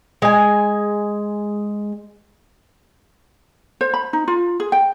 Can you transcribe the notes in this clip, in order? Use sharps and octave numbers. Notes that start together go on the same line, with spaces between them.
G#3 G#5
C5
B5
D#4
F4
G#4
G5